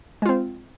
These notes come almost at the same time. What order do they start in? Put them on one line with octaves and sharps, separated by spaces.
G#3 F4 C4